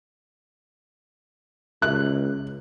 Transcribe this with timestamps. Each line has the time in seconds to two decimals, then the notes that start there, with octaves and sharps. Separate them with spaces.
1.82 C#2 F#6